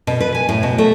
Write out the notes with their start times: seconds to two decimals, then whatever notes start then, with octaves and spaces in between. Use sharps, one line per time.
0.07 B2
0.20 B4
0.35 G#5
0.49 A2
0.63 B2
0.78 A3